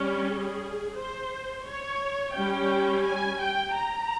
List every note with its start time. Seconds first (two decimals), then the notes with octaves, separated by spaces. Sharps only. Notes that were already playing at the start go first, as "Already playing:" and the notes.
Already playing: G3 C#4
0.28 G#4
0.98 C5
1.66 C#5
2.36 G3 C#4 G5
3.05 G#5
3.40 G5
3.75 A#5